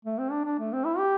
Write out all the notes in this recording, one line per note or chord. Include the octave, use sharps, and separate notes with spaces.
A3
C4
D4
D4
A3
C4
E4
G4